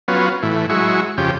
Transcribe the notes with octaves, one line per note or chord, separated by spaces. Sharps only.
F#3 B3 C#4 F4
A2 E3
F#3 G#3 E4 C#6
F2 C#3 G4